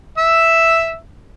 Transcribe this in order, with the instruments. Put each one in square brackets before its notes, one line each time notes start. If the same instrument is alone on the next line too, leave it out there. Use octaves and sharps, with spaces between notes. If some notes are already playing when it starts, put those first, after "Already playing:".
[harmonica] E5 E6